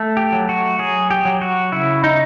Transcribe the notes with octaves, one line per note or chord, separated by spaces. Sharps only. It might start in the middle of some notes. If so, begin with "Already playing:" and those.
Already playing: A3
G4
F#3
F#4
F#3 G#4
G4
F#3
F#4
C#3 E4
D#4